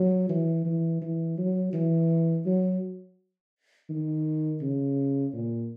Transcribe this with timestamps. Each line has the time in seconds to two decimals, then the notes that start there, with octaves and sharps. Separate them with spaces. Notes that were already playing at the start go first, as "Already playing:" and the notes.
Already playing: F#3
0.29 E3
0.65 E3
1.02 E3
1.38 F#3
1.73 E3
2.46 F#3
3.90 D#3
4.62 C#3
5.33 A#2